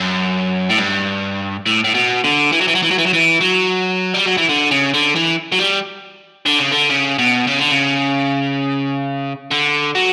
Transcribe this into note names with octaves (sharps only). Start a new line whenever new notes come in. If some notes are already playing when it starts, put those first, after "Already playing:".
Already playing: F#2
A2
G2
A2
A2
B2
D3
E3
F#3
E3
F#3
E3
F#3
E3
F#3
E3
F#3
G3
F#3
E3
D3
C#3
D3
E3
F#3
G3
D3
C#3
D3
C#3
B2
C#3
D3
C#3
D3
F#3